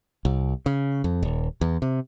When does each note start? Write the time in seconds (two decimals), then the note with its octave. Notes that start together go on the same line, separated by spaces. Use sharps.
0.25 C2
0.66 C#3
1.04 F2
1.23 D#1
1.61 E2
1.82 C3